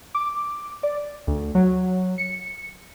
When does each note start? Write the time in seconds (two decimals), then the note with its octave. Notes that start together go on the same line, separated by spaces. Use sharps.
0.15 D6
0.83 D5
1.27 D2
1.55 F#3
2.18 C#7